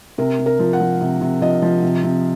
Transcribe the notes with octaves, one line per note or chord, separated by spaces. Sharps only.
C3 A#4
C3
A#4
F3
F#5
F3
C3
C3
F3 D#5
F3
C3
C3